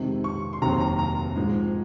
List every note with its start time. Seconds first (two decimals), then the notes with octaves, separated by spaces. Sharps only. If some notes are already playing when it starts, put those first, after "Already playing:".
Already playing: F2 C3 D#3 G#3
0.24 C#6
0.53 C6
0.62 F1 D#2 D#3 F#3 C4 A#5
0.81 A#5
0.99 A#5
1.36 G#2 F3 G#3